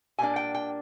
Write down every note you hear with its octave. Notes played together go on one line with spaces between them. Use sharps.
A#2 G3 A#3 D4 G#5
G5
G5